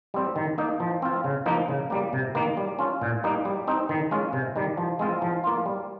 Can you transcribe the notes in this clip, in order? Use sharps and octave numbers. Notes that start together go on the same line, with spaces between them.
G3 C4
D#3
A#3 D#4
F3
C4 F4
C#3
F3 A#3 D#4
C#3
G3 A#3
C3
D#3 A#3
G3
C#4 F4
A#2
G3 A#3 D#4
G3
C4 D#4
D#3
G#3 C#4 F4
C3
D#3 G3
F3
G#3 C4 F4
F3
A#3 F4
G3